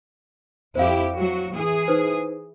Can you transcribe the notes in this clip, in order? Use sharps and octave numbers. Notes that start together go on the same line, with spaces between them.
F2 E4 G4 C5 F5
F#3 F#4
E3 G#4
D#4 B4 C5